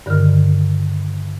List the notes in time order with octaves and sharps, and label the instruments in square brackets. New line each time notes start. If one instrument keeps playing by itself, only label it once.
[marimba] G2 D3 D#3 A#4 F6